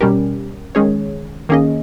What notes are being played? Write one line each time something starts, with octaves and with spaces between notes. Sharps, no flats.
B2 G3 C#4 G4 A#4
D#3 G#3 C#4 G#4 C#5
D#3 A#3 C#4 G#4 D#5